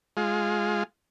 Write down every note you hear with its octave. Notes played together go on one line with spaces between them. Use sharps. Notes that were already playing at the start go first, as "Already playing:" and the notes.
G#3 F4